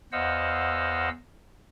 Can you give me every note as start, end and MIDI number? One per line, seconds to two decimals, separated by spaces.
0.12 1.09 40
0.12 1.09 72
0.12 1.09 75
0.12 1.09 77
0.12 1.09 78
0.12 1.09 88